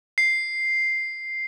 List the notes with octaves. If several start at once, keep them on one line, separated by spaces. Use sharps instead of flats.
C7